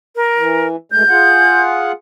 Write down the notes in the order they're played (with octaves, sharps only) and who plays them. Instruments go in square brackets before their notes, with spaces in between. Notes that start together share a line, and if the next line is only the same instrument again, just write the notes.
[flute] A#4
[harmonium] E3
[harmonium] B2 G#3 A3 [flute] G6
[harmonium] F4 G#4 F#5